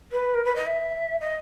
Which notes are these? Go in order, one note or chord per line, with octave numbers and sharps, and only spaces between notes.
B4
A#4
B4
D#5
E5
D#5